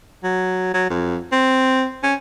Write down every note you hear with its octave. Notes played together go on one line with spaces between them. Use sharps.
F#3
F#3
F2
C4
C#4